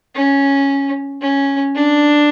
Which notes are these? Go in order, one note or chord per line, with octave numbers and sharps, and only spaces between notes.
C#4
C#4
D4